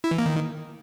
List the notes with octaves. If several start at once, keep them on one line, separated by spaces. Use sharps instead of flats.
E4
E3
A#3
D#3